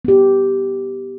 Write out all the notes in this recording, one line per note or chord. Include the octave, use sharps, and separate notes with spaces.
B3 G4